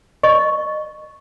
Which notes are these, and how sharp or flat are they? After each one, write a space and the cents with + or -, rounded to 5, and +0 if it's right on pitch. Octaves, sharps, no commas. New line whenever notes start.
D#5 -30 C#6 +0